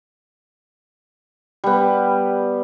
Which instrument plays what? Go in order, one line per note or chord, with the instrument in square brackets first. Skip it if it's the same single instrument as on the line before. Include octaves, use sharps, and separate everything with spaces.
[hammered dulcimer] G3 B3